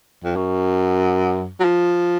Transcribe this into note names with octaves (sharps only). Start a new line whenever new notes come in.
F2
F#2
F#3
F3